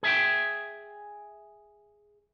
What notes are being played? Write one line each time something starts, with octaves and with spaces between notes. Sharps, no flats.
G#4 E5 G5